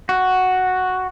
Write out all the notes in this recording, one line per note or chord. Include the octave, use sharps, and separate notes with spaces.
F#4